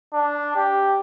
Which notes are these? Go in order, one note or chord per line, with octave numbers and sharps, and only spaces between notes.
D4
G4